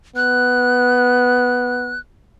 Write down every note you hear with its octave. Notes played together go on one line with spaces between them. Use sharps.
B3 F#6